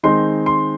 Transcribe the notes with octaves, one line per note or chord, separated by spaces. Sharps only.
D#3 G#3 C4 D#4 C6
C6